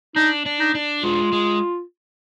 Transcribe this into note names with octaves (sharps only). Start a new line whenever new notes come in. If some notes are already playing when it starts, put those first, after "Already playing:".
D4 D#4
D4
D#4
D4
G#3 F4
G#3